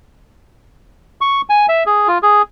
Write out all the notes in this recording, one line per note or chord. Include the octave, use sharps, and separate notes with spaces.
C#6
G#5
E5
G#4
F4
G#4